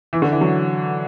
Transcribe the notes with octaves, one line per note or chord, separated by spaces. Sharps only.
E3
D3
E3
F#3